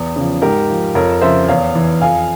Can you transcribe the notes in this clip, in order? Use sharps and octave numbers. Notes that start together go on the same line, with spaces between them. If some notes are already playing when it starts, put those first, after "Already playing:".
Already playing: E2
C#3 F3
G#2 G4 A#4
F3
F2 A#4 C#5
C#3 F3 C5 E5
E2 C#5 F5
E3
F2 F5 G#5